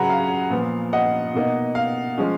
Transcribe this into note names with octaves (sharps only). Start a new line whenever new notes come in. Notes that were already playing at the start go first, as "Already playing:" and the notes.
Already playing: C#3 F#3 C#4 F#5 G#5 A#5 B5
F5
A#2 F3 B3
D#5 F#5
B2 A#3 D#4
F5
F3 G#3 C#4